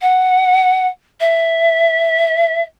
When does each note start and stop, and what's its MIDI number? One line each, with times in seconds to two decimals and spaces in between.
0.01 0.87 78
1.20 2.61 76